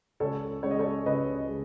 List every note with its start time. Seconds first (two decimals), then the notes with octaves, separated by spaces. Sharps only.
0.20 C#2 A4 C#5
0.63 C#3 G#3 C#5
0.71 D#5
0.79 A4 C#5
1.06 C#2 B4 D#5
1.49 G#3